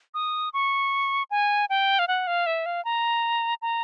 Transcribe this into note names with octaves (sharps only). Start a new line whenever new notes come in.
D#6
C#6
G#5
G5
F5
F#5
F5
E5
F5
A#5
A#5